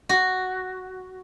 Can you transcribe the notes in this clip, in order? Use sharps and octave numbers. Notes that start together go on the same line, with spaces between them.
F#4